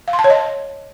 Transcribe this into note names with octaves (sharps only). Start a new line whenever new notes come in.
F5
C6
A5
C#5
D#5